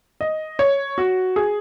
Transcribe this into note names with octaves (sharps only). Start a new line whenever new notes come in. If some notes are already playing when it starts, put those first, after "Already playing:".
D#5
C#5
F#4
G#4